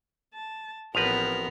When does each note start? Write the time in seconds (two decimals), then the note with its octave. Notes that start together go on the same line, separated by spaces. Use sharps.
0.34 A5
0.95 A1 F3 B3 C4 A#4 B4 A#6 F7